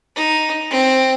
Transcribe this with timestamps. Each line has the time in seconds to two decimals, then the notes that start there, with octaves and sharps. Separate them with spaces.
0.16 D#4
0.70 C4